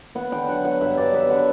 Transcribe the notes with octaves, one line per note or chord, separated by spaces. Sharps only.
B3 F#5
D3 G5
F#3 F#5
F#3 F#5
G2 E5
G2 D5
B3 E5
D3 F#5